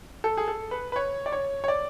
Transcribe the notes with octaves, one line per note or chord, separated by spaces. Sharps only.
A4
G#4
A4
B4
B4
C#5
D5
C#5
C#5
D5